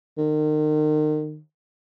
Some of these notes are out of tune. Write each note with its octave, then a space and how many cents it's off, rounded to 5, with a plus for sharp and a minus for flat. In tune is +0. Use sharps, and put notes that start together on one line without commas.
D#3 -35